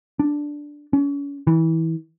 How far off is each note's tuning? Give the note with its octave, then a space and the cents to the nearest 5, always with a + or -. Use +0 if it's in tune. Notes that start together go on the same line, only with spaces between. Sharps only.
D4 +0
C#4 +35
E3 -25